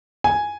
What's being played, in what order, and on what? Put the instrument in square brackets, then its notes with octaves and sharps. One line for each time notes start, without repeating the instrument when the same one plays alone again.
[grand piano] G#5